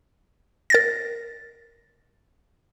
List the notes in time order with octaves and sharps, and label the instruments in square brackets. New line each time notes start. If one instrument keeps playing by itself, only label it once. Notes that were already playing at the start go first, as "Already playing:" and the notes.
[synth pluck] A#4 A6 A#6